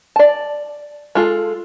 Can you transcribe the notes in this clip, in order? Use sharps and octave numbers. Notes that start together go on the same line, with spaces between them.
D5 A5
G#3 F4 A4